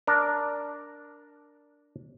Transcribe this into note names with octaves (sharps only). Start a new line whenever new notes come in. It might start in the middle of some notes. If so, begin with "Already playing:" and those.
D4 A#4